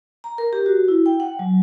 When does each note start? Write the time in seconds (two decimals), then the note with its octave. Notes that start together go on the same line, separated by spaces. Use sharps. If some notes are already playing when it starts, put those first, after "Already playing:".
0.24 A#5
0.38 A#4
0.53 G4
0.66 F#4
0.88 E4
1.06 G5
1.20 F#5
1.39 F#3